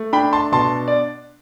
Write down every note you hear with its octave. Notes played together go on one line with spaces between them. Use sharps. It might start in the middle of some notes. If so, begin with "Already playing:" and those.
Already playing: A3
D4 G5 B5
A5 C6
B2 A5 C6
D5